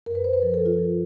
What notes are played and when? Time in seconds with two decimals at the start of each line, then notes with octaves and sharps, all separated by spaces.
0.06 F#2 A#4
0.15 B4
0.24 F#2 C5
0.33 B4
0.42 F3 A#4
0.54 A4
0.60 F3
0.66 F4
0.78 F3